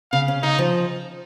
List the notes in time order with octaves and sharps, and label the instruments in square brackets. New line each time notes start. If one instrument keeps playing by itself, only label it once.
[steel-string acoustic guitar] C#3 [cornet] F5
[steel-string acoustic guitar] C#4
[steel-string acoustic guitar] C#3 [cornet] D#4
[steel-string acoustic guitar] F3